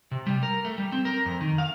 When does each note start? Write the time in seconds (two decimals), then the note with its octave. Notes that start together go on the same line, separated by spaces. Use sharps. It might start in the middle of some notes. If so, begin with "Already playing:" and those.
0.11 C3
0.27 G3
0.43 A#4
0.65 A3
0.78 G3
0.92 C4
1.05 A#4
1.26 F2
1.41 D#3
1.58 F5